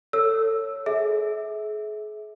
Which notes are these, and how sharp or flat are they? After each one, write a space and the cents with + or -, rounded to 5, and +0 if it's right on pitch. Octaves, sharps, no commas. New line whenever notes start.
A4 +25 C#5 +0 E6 +0
G#4 +35 E5 -25